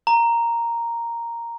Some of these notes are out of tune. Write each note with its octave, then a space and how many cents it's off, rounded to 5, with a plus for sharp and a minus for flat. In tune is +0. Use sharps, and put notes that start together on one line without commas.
A#5 +0